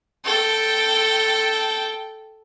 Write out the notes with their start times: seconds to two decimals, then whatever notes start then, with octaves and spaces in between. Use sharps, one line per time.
0.25 A4 G5